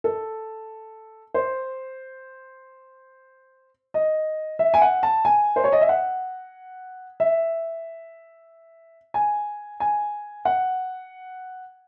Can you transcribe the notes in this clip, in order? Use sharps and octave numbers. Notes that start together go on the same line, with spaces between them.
A4
C5
D#5
E5
G#5
F#5
A5
G#5
C5
C#5
D#5
E5
F#5
E5
G#5
G#5
F#5